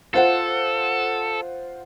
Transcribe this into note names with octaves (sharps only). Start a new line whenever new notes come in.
F4 A4 C5 F#5